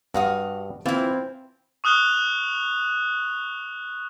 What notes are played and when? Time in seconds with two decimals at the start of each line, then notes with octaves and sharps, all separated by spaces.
0.14 G2 F#4 F5 D#6
0.86 E3 C4 E4 F4
1.84 C#6 D#6 F6 F#6 F7 G7